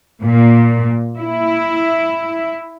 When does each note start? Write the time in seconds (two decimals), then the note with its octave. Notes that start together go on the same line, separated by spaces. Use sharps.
0.22 A#2
1.19 E4